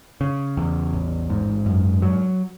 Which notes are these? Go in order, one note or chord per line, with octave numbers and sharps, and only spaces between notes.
C#3
E2
A1
G#2
F#2
F#3